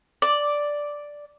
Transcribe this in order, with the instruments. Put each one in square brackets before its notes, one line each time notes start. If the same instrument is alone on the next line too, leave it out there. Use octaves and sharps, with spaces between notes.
[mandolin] D5